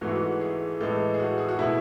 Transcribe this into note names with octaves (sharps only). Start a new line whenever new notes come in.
G#2 E3 A3 F#4
G#4
F#4
G#4
A2 E3 G#3 A4
G#4
F#4
G#4
F#4
B2 A3 E4